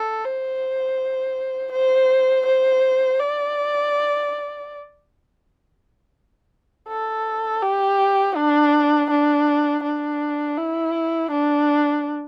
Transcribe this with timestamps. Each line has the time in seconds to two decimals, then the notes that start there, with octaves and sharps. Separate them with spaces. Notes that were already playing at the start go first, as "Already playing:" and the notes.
Already playing: A4
0.25 C5
1.72 C5
2.46 C5
3.20 D5
6.89 A4
7.62 G4
8.37 D4
9.10 D4
9.84 D4
10.57 E4
11.31 D4